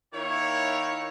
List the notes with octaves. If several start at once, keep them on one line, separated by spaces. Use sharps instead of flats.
D#3 A#3 E4 C#5